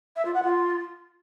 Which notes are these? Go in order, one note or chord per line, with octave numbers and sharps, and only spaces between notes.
E5
F4
F#5
F4